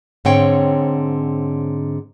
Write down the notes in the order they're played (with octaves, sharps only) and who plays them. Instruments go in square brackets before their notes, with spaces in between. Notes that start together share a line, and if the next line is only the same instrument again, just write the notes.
[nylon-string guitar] G#2 D3 C4 C#5 G5